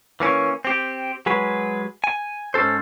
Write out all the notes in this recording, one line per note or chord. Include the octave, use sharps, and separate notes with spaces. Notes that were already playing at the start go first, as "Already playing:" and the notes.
E3 A#3 C#4
C4 G4
F#3 G#3 G#4 B4
G#5
G#2 C#4 A4 C5